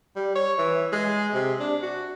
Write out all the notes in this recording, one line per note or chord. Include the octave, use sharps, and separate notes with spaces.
G3
C#5
E3
G#3
C3
D4
F#4